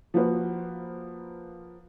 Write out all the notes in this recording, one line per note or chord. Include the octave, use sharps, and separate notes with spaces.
F3 A#3 F#4 B4 C5